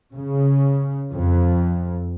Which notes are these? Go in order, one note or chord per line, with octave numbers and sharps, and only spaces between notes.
C#3
F2